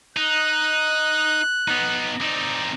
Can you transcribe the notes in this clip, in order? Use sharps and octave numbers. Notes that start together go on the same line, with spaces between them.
D#4 F#6
B3 D#4
C4 D#4 D5